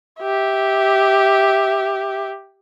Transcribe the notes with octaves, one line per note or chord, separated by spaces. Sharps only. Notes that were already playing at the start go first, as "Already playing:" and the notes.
G4 E5